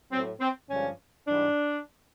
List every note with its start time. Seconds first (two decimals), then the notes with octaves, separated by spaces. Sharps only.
0.11 A2 F#3 C4
0.40 C4
0.69 G2 D3 F3 G#3 C#4
1.27 G#2 E3 G3 D4